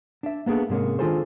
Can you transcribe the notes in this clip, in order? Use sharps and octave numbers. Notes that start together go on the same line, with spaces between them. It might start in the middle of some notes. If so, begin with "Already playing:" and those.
D4 E5
A#3 B3 D4 G#4 A4
G#2 C3 G#3 A#3 C#4
D#3 D4 F4 G#4 A4 C5